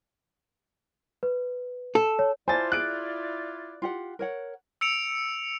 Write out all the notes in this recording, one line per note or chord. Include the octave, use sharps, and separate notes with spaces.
B4
A4
C#5
E4 F4 C5 D5 G#5 A5 A6
G#4 F#6 D7
F4 G4 F#5
A#4 C#5 F#5
E6 C#7 D7 F7